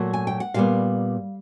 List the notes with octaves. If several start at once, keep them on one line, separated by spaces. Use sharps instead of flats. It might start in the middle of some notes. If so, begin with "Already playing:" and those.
Already playing: A#2 F#3 A3
G#5
G5
F#5
A#2 G3 B3 F5